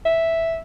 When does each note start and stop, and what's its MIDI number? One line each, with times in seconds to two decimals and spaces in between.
0.05 0.60 76